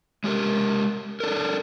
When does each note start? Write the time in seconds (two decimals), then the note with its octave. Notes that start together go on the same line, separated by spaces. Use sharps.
0.24 G#3 G4 A4 A#4
1.20 D4 A4 A#4